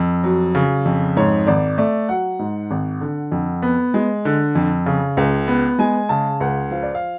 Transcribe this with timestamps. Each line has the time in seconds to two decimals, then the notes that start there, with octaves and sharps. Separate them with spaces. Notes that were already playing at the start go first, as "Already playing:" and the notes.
Already playing: F2
0.24 F#3
0.55 C#3
0.85 F2
1.16 G#2 C#5
1.47 G#1 D5
1.78 A3 D5
2.09 F#3 F#5
2.39 G#2
2.71 G#1
3.01 D3
3.32 F2
3.62 B3
3.94 G#3
4.25 D3
4.55 F2
4.86 C#3
5.17 C#2
5.48 B3
5.79 G#3 G#5
6.09 C#3 A5
6.40 C#2 F#5
6.71 F3 F5
6.83 D5
6.95 F5